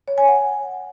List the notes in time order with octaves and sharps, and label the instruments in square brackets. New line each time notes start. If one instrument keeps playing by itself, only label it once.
[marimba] C#5
G#5
F#5